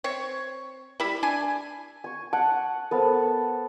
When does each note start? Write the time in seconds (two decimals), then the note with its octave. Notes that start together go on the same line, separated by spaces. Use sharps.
0.04 C4 C#5
1.00 G3 E4 B5
1.23 D4 G#5
2.04 G#5 C#6
2.33 F#5 A5
2.91 B3 A4 A#4 C5